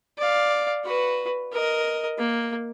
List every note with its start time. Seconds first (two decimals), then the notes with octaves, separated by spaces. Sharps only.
0.18 D5 F5
0.84 F#4 B4
1.52 A#4 D#5
2.18 A#3